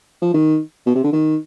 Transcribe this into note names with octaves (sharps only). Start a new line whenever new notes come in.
F3
D#3
B2
C3
D3
D#3